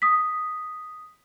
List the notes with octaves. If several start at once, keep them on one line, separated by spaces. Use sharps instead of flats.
D#6 B6